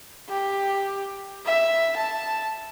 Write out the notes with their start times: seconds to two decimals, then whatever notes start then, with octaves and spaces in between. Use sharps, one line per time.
0.29 G4
1.45 E5
1.96 A5